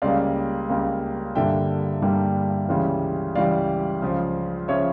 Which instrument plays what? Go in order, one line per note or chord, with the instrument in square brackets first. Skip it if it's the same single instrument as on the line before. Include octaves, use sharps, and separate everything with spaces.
[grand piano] C#2 C#3 G3 A#3 D5 F5
C#2 C#3 G3 A#3
G2 D3 G3 A#3 E5 G5
G2 D3 G3 A#3
C#2 C#3 E3 G3
C#2 C#3 E3 G3 D5 F5
C#2 C#3 F3
C#3 F3 C#5 E5